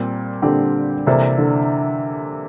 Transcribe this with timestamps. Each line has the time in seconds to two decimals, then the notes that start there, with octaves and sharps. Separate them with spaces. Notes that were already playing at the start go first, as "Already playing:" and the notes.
Already playing: A#2 G3 C4 G4
0.42 A#2 D3 G3 C4 G4
1.06 C3 E3 A#3 D4 A4 C5
1.38 D3